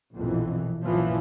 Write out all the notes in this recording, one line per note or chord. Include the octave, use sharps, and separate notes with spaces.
A#1 F2 B2 E3
A#1 F#2 A#2 E3 F3